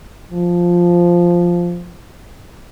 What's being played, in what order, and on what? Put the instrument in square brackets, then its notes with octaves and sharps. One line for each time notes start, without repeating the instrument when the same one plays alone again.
[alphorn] F3